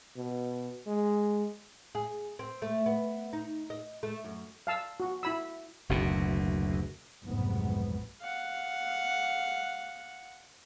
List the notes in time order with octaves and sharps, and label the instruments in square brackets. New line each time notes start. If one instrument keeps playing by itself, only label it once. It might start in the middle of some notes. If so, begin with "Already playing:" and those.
[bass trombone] B2
G#3
[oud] G#4
C4
A3
B3
D#4
D#5
A3
F#2
[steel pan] F5 A5 E6
F#4
E4 B5 E6
[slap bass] F#1 D2 B2
[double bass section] F1 B1 G#2 B3
[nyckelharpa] F5 F#5